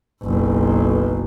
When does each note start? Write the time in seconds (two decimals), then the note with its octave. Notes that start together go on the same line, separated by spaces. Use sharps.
0.23 F#1 B1